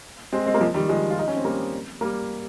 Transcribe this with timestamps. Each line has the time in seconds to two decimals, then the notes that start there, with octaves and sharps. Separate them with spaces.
0.33 G#3 C4
0.47 G#3 C4
0.54 A#3
0.60 F3 G#3
0.74 D#3 G3
0.89 F3 G#3
1.10 F4
1.19 D#4
1.28 C#4
1.37 C4
1.45 G3 A#3
2.01 G3 A#3